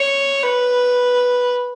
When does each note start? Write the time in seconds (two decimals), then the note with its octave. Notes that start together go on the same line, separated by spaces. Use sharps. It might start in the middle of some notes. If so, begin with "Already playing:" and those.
Already playing: C#5
0.43 B4